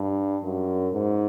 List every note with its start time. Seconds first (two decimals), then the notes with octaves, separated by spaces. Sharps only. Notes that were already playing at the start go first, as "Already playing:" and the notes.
Already playing: G2
0.43 F#2
0.94 G#2